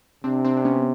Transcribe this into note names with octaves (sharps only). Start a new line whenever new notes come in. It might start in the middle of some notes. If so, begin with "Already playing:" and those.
C3 C4 D4
C4 D4
D4
B3 C#4